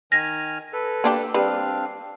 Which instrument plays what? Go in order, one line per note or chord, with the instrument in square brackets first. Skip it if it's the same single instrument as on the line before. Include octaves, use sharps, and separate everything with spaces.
[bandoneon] D#3 G#5 F6 [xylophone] A#6
[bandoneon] A4 B4
[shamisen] A#3 D4 G4
[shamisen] G3 B4 [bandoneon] C4 D4 F5